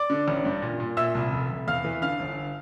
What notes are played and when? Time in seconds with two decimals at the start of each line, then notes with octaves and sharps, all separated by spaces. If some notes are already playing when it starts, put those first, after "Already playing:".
Already playing: D5 D6
0.10 D3
0.28 A1
0.45 G2
0.62 A#2
0.80 A#2
0.97 A#2 E5 E6
1.15 C2
1.32 F1
1.50 F1
1.68 E2 F5 F6
1.85 E3
2.02 D3 F5 F6
2.19 G1